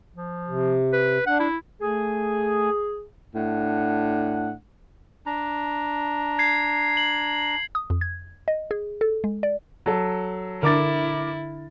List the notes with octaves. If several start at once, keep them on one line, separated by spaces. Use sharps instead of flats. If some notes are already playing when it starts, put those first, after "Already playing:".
F3
C3
B4
D4 F#5
E4
A3 G#4 G#5
A2 D4 F#5
D4 A#5
G#6 C7
F#7
D#6
F2
G#6
D#5
G#4
A4
G#3
D5
F#3 A4
D3 E4 A#4 D6 A6